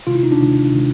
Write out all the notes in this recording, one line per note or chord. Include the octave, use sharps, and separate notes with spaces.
C3 D#3 G#3 F4
E4
D#4
D4
C3 D#3 G#3
C3 D#3 G#3